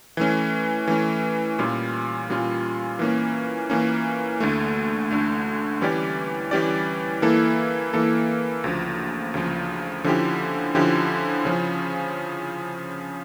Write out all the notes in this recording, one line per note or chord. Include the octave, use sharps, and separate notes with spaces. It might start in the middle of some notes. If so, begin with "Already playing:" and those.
E3 A3 C#4
E3 A3 C#4
A#2 G3 C#4 F4
A#2 G3 C#4 F4
E3 A#3 C#4
E3 A#3 C#4
D2 D3 A3
D2 D3 A3
E3 G3 C#4 G4 D5
E3 G3 C#4 G4 D5
E3 A#3 E4 A4
E3 A#3 E4 A4
D2 C#3 F3
D2 C#3 F3
D3 F3 C#4 E4 G4
D3 F3 C#4 E4 G4
C#3 F3 C#4